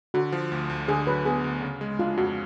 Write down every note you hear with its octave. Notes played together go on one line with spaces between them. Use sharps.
D3 F#4
F3
D2
D2
D3 G#4
F#3 B4
B3 G#4
D2
C#3
G#3
D4 F4
F2 F#4